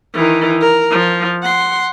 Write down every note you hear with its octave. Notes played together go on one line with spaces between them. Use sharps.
D#3 E3
A#4
F3
F#5 C6